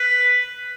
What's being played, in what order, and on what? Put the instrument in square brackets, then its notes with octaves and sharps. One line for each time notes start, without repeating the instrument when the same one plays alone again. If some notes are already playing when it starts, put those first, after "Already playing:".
Already playing: [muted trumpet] B4